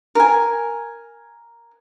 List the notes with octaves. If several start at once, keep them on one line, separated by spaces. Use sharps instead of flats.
A#4 G#5